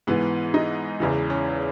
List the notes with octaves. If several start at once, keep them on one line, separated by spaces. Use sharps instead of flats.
G#2 E3 B3
D#4
E2 C#3 E3
C#4